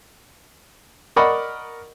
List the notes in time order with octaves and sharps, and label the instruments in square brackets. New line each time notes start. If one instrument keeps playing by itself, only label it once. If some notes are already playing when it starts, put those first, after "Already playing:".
[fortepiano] A#4 D5 D#5 F#5 B5 C#6